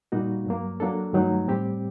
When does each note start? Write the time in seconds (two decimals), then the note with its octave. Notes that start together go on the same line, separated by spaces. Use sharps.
0.12 A#2 G3 A#3 D#4 F#4
0.46 G2 F#3 A#3
0.80 F#3 A#3 D4 A4
1.14 G2 D#3 F#3 A3 D#4
1.48 A2 G3 C4 G4